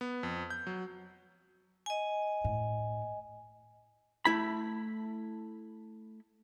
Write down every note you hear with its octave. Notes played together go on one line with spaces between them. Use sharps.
B3
F2
G6
F#3
D#5 G#5
A2
A3 E4 B5